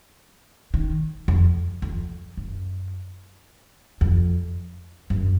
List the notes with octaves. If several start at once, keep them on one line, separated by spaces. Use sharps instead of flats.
D#3
F2
F2
F#2
F2
F#2